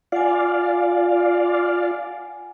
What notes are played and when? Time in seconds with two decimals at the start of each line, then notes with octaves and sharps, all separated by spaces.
0.12 F4 D5 F5 F#5 G#5